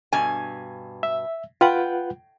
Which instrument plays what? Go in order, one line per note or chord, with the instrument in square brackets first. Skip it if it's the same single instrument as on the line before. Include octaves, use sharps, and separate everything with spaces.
[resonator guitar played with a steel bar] G2 B2 G#5
[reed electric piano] E5
[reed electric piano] F4 B4 F#5 [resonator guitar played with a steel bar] G5